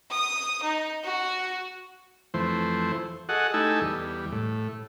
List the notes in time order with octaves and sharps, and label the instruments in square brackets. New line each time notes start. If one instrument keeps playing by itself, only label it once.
[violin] D#6
D#4
F#4
[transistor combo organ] F2 E3 A3 C5
F#4 G#4 A4 D#5 F#5
A3 D#4 E4 G4 A4 G#5
E2 G3
A2